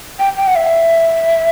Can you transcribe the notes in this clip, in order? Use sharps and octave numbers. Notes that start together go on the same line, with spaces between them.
G5
G5
F#5
E5